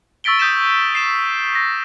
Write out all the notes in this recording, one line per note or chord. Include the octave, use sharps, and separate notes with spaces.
C#6 E6 A6 B6 D7 G7
D#6 G6 B6 E7
C7 E7
A#6